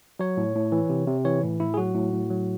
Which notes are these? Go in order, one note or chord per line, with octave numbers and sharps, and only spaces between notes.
F#3 C#5
A2
A2
E3
C3
C3
E3 C#5
A2
A2 E4
G#4
F#3 F#4
A2
A2
F#3